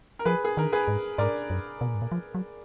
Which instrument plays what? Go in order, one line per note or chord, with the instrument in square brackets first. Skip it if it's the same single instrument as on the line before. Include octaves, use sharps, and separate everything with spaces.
[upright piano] A#4
[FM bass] F3 [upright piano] G#4 B4
[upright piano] G#4
[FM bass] D#3 [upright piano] A#4
[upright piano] G#4 B4
[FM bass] G#2
[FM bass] G#2 [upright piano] A#4 D5
[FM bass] F#2
B2
A#2
G#2
A#2
F3
F#3